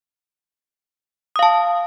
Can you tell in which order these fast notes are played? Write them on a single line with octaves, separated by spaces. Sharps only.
D#6 F5 A5